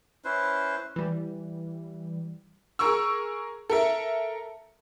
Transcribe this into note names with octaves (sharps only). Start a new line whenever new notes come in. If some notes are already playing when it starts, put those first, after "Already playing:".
C#4 E4 B4 C5
E3 G3
G#4 A#4 C#6 E6
A4 A#4 E5